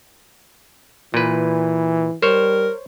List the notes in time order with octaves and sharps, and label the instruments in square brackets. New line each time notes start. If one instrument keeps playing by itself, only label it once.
[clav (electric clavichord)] A#2 B4 [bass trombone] E3
[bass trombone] G3 [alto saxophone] A#4 [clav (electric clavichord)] C5 C#5